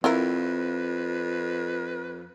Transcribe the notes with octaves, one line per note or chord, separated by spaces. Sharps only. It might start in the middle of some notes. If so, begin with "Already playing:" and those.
F2 C4 E4 F4 A#4 B4